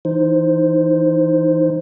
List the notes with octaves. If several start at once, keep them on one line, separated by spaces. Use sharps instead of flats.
E3 D#4 C5